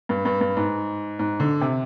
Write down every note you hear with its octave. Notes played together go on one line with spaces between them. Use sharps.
G2
G2
G2
G#2
G#2
D3
C3